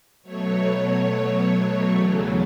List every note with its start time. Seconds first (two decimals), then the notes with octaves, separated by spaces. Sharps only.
0.23 B2 F#3 A3 C#5
1.89 E2 C#3 F#3 A3